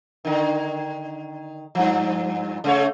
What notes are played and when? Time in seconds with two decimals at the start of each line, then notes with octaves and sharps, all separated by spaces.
0.25 D3 D#3
1.75 G2 F3
2.64 C#3 A3 C#5